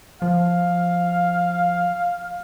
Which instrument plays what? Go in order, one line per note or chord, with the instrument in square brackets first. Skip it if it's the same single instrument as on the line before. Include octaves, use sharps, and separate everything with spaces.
[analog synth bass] F3 [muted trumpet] F5